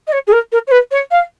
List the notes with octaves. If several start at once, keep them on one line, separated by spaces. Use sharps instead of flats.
D#5
C#5
G#4
A#4
A#4
C#5
B4
C#5
F5